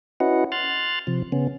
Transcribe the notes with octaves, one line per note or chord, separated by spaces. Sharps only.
C#4 E4 F#4 B4 D#5 F#5
C6 F6 F#6 A6
C3 F3
C#3 B3 C#4